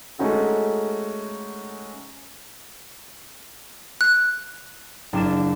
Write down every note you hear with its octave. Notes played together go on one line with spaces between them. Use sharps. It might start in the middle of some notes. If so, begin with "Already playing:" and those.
G#3 A3 C#4 D#4 F#4 A4
F#6
F#1 D4 E7